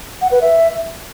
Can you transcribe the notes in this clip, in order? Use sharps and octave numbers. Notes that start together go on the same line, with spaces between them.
F#5
B4
E5